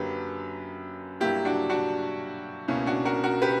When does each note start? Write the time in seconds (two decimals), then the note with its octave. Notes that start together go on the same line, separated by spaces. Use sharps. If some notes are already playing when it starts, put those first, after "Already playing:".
Already playing: F#2 D3 F#3 A#3 G4 B4
1.20 G2 F#3 A#3 E4 G4
1.45 D4 F#4
1.70 D4 F#4
2.68 C#2 B2 A#3 C#4 E4
2.86 D4 F#4
3.05 F#4 A#4
3.24 F#4 A#4
3.42 G4 B4